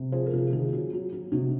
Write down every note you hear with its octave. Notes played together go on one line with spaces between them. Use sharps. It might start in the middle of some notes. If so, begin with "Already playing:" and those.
Already playing: C3
F3 G#4 C5
A#4
C3 F4 G#4
D#3 F4 G#4
F#3
F#3
F#3
C3 D#4 F#4